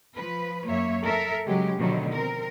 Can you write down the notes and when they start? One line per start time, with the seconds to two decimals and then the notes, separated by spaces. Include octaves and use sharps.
0.16 F3 B4
0.67 F#2 A#3 C#5 E5
1.04 A4 A#4 E5
1.46 C#3 F#3 G#3 G4
1.77 B2 D3 D#3 F3 F#3 A3
2.11 C4 A#4